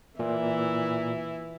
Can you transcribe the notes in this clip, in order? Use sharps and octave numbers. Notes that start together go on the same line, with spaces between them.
A#2 E3 E4